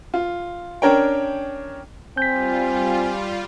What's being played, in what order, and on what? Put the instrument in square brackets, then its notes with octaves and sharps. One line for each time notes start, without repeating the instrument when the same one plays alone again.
[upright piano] F4
C#4 D4 A#4 C#5 G5
[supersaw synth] G3 F4 [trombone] C4 [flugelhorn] G#5 [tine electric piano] G6 B6